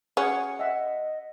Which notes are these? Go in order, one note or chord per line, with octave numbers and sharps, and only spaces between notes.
C#4 G#4 C#5 F#5
D#5 E5 F#5